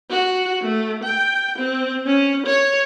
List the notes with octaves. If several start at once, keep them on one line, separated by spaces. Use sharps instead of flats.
F#4
A3
G5
C4
C#4
C#5